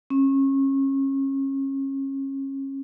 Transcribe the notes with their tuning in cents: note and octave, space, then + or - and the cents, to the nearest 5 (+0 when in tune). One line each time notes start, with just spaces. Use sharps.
C#4 -30